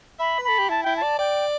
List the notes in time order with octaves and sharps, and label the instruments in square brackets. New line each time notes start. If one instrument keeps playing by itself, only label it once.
[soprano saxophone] E5 [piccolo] B5
[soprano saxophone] B4
[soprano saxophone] A4 [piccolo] B5
[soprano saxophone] G4
[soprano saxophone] E4 [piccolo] A5
[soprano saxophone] E4 [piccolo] G5
[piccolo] A5
[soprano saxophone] D5
[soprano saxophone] D5 [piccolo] G5